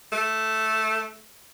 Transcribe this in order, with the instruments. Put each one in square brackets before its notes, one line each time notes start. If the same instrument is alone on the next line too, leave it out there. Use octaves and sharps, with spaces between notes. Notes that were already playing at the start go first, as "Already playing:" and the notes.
[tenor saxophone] A3